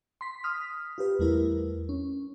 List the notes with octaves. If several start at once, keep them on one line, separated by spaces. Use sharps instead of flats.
C6 B6
D#6 F6 B6
F4 G4 B4
E2 G3 A3 E4 A#4
C#4